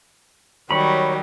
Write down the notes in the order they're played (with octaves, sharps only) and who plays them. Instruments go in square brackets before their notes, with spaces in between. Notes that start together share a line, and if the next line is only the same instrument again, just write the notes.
[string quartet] D#3 F#3 G3 [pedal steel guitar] C#5 B5